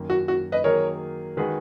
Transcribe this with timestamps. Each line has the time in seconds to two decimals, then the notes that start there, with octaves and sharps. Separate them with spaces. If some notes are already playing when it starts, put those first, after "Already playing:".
Already playing: F#2 D#3 A#3
0.10 F#4
0.28 F#4
0.52 B4 D#5
0.64 D#3 F#3 A#3 D#4 G#4 A#4 C#5
1.37 D#3 G#3 D#4 F#4 G#4 B4